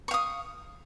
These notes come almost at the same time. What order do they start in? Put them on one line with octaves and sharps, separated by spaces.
C#6 F5 D#6